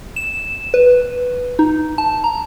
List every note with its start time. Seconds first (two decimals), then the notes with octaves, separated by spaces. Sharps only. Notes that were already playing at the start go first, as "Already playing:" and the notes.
0.16 E7
0.74 B4
1.59 D#4
1.98 A5
2.24 A#5